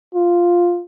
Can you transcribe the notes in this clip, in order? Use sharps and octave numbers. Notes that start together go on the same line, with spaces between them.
F4